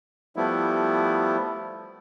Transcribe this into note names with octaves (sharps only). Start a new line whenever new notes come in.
F3 G3 A3 B3 E4